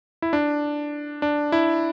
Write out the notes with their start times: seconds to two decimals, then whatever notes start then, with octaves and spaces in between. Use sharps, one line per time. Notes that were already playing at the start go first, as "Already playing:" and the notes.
0.22 E4
0.33 D4
1.22 D4
1.52 E4